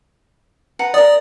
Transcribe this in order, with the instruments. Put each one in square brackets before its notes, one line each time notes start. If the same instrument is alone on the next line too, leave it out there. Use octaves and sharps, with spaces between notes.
[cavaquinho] B4 F#5 A#5
[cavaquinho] A#4 D#6 [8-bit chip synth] D5